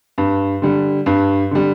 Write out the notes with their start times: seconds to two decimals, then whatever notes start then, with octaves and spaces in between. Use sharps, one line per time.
0.18 G2
0.62 D3 G3
1.06 G2
1.51 D3 G3